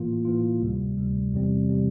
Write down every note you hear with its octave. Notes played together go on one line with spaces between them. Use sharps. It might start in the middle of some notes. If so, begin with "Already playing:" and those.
Already playing: A2 E3 A#3 F4
A2 E3 A#3 F4
D2 C3 G3
D2 C3 G3
E2 C3 E3 G3 C4
C3 E3 G3 C4